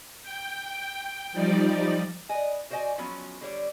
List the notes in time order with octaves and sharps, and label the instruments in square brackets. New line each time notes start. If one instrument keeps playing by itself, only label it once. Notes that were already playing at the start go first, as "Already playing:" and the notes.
[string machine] G5
F3 G3 D#4 D5
[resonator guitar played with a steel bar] B4 D5 D#5 G#5
F#4 C5 D5 D#5 F#5 G#5
F3 F#3 B3 C#4 F#4
D3 G3 C#5 D5